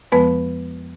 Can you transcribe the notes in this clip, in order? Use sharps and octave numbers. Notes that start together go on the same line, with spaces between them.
F2 F3 G#3 B3 B4